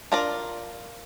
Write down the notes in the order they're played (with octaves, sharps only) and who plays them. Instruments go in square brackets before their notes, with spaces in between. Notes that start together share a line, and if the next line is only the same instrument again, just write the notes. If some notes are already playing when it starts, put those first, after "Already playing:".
[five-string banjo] D4 F4 A#4 D5